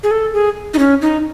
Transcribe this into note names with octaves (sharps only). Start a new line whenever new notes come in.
G#4
A4
G#4
D#4
C#4
D#4